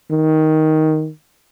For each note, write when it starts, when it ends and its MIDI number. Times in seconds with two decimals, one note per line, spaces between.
0.11 1.09 51